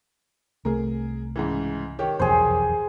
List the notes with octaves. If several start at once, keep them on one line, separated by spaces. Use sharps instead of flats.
C2 A3 G#4 A#4
G#2 C#3 E3
D#3 G4 C#5
F1 B1 E2 G#4 C5